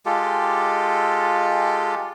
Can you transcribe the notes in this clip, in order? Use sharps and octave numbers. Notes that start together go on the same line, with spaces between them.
G#3 F4 G4 A4